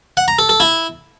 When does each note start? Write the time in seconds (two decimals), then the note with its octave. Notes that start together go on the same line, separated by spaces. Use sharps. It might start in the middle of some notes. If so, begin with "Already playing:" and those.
0.17 F#5
0.28 A#5
0.39 A4
0.49 A4
0.60 E4